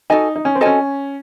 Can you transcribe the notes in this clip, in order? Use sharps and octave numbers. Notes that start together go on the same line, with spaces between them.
D#4 F#4 A4 D#5 G#5
D#4
C#4
C4
C#4 F#4 A4 D#5 G#5